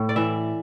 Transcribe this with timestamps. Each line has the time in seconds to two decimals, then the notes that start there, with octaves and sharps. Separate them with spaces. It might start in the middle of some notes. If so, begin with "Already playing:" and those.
Already playing: A2
0.09 D5
0.16 E3 E5